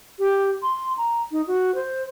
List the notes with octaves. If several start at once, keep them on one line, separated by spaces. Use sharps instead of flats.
G4
C6
A#5
D#4
F#4
C5